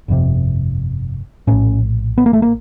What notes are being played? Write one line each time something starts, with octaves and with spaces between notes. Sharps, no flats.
G1 F2 C3
A#1 A2 C#4
B3
A#3
A3
A#3